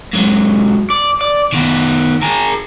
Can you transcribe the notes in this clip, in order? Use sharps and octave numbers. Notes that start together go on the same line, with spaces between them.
G#2 F#3
D5
D5
D#3 B3
G#4 A#4